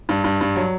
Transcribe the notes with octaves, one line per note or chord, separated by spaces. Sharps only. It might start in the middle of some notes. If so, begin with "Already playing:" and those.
G2
G2
G2
F#3